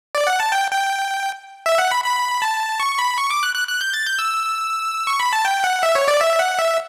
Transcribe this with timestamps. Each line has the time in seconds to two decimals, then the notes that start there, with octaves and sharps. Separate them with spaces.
0.15 D5
0.27 F#5
0.40 A5
0.52 G5
0.71 G5
1.66 E5
1.78 F#5
1.91 B5
2.04 B5
2.42 A5
2.80 C#6
2.99 B5
3.18 C#6
3.31 D6
3.43 F#6
3.55 F#6
3.68 F#6
3.81 G6
3.94 A6
4.07 G6
4.19 E6
5.07 C#6
5.20 B5
5.33 A5
5.45 G5
5.64 F#5
5.83 E5
5.95 C#5
6.08 D5
6.21 E5
6.39 F#5
6.59 E5